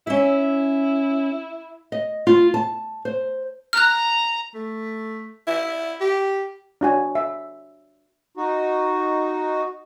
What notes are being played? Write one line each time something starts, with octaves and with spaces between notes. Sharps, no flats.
C#4 E4 E5
D#5
F4
A5
C5
A#5 F6 F#6
A3
E4
G4
D4 F#4 G#5
E5
D#4 F#4